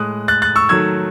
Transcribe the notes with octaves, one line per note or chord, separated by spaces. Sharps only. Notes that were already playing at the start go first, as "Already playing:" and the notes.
Already playing: A2 G#3 D#6 F#6
F#6 A6
F#6 A6
C#6 E6
D#3 F#3 A3 E6 G#6